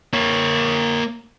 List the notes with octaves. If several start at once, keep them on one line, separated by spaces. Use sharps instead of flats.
A#3 C#5